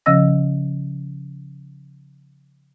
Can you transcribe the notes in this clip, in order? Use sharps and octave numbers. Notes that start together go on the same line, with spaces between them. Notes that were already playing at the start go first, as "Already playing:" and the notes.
C#3 F3 C#4 D#5 E6 A#6